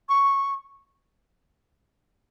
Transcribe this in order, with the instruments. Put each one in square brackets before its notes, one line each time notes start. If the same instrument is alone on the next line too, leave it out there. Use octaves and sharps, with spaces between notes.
[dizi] C#6